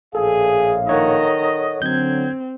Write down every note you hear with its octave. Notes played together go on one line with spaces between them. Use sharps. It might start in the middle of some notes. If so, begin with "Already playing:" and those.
A#1 A2 G#4 A4 F5
D#3 A4 C#5 D#5 F#5 A#5
D3 F#3 C4 G6 G#6